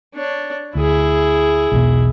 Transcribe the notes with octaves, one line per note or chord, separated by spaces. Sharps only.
D4 C#5
D2 E4 G#4
B1 E2 B2